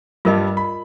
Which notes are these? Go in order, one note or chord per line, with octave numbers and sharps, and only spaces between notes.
G2 G3 F4 A#4 D#5
B5